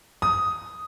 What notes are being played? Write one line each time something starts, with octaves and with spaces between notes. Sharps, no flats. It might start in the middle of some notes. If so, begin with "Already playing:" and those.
D#6